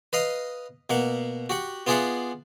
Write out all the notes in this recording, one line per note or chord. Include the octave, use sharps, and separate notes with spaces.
B4 D#5 F5
B2 A#3 F#5
F#4 G4 F#5
B3 F4 G#4 D5 E5 F#5